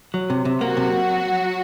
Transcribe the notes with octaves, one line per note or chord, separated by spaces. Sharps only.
F#3
C3
C3
F#3 A#3 F#4
C3